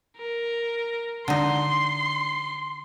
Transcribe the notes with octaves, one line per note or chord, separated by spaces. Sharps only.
A#4
D3 D#4 C6